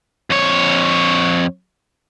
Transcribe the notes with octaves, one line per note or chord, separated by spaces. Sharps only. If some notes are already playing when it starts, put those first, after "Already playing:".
F2 C#5